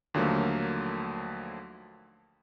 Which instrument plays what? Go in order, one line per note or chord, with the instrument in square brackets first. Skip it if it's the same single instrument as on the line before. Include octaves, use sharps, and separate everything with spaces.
[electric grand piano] D#2 D3 F3 F#3 A3 A#3